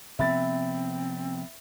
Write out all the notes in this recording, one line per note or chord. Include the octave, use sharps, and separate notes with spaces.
C3 F3 B3 C4 E5 B5 A6